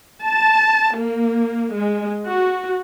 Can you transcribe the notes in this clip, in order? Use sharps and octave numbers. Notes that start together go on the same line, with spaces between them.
A5
A#3
G#3
F#4